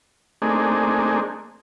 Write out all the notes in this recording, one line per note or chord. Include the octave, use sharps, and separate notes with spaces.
A3 A#3 C4 D4 D#4 G#4